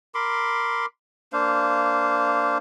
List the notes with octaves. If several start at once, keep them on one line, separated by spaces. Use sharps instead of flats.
A#4 B5 C6 D6
A#3 D4 C5 F5